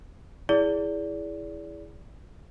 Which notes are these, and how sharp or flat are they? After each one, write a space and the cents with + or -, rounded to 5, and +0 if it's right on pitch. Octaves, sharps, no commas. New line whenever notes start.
E4 +0 G#4 +0 D5 -30